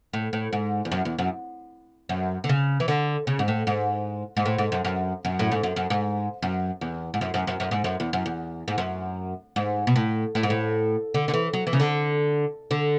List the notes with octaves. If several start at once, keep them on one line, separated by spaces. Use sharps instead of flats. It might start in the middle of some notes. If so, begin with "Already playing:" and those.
A2
A2
G#2
E2
F#2
E2
F#2
F#2
D3
C#3
E3
D3
C#3
G#2
A2
G#2
G#2
A2
G#2
F#2
F#2
F#2
A2
G#2
F#2
F#2
G#2
F#2
E2
G#2
F#2
F#2
F#2
F#2
G#2
F#2
E2
F#2
E2
G#2
F#2
G#2
B2
A2
A2
G#2
A2
D3
D3
E3
F#3
E3
C#3
D3
D3